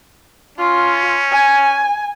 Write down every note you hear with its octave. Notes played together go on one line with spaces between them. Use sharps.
C#4 F4
G#5